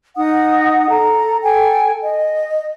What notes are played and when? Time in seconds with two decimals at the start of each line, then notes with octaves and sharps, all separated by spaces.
0.17 D#4 F#5 D#6
0.89 A4 A#5
1.44 A4 G5 G#5
2.03 D#5